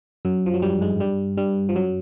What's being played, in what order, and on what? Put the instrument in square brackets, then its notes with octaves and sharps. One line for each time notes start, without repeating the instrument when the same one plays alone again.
[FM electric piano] F#2 F#3
F3
F#3
G2 G3
G#2 G#3
G2 G3
G2 G3
F3
F#2 F#3